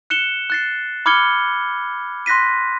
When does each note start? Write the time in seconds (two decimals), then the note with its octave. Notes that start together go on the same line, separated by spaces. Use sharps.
0.10 F#6 C#7 E7 G7
0.50 F#6 A6 C7
1.06 B5 D6 F6 G#6 C#7 G7
2.26 C6 F#6 A#6 B6 D#7